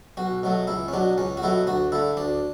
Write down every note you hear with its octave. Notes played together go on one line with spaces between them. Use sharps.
B1 F#4
B2 F#3 A3
C#2 E4
C#4
B2 F#3 D4
C#2 C#4
F#4
B2 F#3 A3 E4
D2 F#4
D3 A3 E4
D2 D4